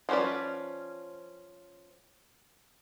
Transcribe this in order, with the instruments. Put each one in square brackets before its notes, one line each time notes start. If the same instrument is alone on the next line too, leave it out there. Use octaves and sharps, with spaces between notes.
[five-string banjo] F3 C#4 F#4 B4 D5